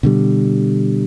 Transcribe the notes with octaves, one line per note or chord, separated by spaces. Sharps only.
B2 D3 G3